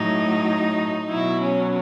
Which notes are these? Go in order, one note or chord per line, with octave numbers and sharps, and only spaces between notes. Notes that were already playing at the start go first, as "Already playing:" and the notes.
Already playing: A2 F#3 D#4
B2 F#3 E4
C#4